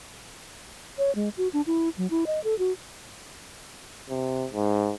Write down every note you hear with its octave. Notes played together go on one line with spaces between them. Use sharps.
C#5
G#3
F#4
D4
E4
F#3
E4
D#5
A4
F#4
C3
G#2